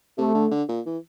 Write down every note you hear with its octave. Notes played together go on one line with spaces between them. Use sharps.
C3 A3
D3
D3
A#2
E3